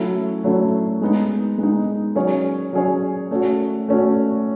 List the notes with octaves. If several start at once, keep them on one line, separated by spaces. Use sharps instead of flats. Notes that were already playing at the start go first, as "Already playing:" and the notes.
Already playing: F#3 A3 C#4 E4
F#3 A3 C#4 E4
G#3 B3 D#4
G#3 B3 D#4
F#3 C#4 G#4 C#5
F#3 C#4 G#4 C#5
A3 C#4 F#4
A3 C#4 F#4